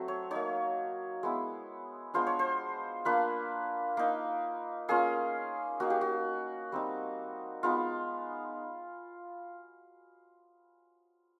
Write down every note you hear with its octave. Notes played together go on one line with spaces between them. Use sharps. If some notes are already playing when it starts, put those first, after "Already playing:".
Already playing: F#3 A3 C4
C#5
A#3 D#4 C#5
G#3 B3 E4
G#3 B3 D4 F4 C5
C#5
C5
A#3 D4 F4 B4
A#3 D#4
A#3 C#4 F4 G#4
A#3 D#4 F#4
G4
F#4
G3 C4 D#4
G#3 B3 D#4 F4